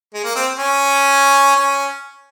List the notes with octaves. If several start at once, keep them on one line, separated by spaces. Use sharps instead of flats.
G#3
A#3
C4
C#4
C#4